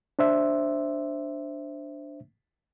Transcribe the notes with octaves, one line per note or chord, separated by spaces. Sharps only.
D4 C5 E5